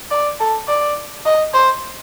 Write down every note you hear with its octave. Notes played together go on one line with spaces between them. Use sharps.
D5
A4
D5
D#5
C5